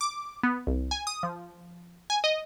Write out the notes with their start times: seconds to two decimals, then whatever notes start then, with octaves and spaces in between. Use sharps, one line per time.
0.01 D6
0.43 B3
0.67 C2
0.91 G#5
1.07 D#6
1.23 F3
2.10 G#5
2.24 D#5